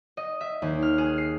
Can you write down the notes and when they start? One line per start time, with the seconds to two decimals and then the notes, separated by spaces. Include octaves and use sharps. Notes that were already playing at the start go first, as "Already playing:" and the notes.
0.17 D#5
0.41 E5
0.62 D#2
0.82 F6
0.98 G#4
1.18 C7